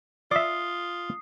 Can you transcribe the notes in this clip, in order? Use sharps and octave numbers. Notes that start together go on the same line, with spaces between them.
F4 D5 E5 D#6 C7